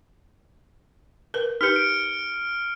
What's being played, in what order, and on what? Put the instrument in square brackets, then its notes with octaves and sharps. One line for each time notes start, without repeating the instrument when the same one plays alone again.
[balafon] A#4 B4
[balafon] D#4 G4 B4 [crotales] F6 C#7
[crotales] D7